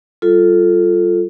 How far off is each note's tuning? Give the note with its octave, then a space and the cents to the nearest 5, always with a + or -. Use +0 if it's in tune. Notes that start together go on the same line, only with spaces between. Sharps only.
G3 -20 F4 +0 A4 +0